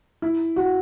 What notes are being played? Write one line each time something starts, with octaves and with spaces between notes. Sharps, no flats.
E4
F#4